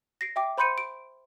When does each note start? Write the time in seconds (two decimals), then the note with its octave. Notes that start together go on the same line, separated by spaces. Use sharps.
0.21 A#6 C7 D7
0.36 E5 G5 D6
0.58 C5 B5 C6 G6 C#7 D#7
0.78 D7